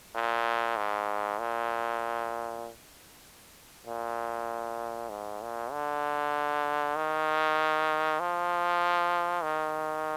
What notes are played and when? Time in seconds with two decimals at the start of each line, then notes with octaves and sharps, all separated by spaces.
0.15 A#2
0.76 G#2
1.39 A#2
3.87 A#2
5.10 G#2
5.41 A#2
5.71 D3
6.95 D#3
8.20 F3
9.43 D#3